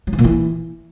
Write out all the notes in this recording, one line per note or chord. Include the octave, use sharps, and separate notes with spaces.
F#3
E3
A#2
E3